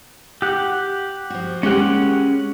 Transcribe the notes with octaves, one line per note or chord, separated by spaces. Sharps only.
G4 F#5
F3 F#4
G#3 A#3 C#4 G4 F#5